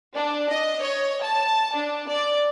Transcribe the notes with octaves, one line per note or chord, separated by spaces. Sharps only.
D4
D#5
C#5
A5
D4
D5